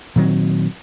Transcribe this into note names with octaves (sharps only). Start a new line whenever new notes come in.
A#2 D#3 F#3 C4